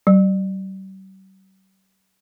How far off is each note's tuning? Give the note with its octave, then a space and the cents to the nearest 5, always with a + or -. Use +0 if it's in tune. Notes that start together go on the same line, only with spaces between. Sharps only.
G3 -45